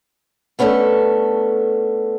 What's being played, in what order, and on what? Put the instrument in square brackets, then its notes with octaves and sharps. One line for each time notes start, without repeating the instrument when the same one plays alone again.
[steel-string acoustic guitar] A3 B3 C#4 D4 A4